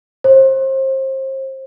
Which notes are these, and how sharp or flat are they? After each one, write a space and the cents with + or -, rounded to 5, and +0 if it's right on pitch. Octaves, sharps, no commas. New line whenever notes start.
C5 +30